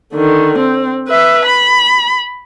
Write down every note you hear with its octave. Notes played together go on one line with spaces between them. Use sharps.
D3 D#3
C4
B4 E5
B5